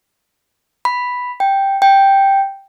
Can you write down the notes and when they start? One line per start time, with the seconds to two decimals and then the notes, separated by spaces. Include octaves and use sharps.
0.85 B5
1.40 G5
1.82 G5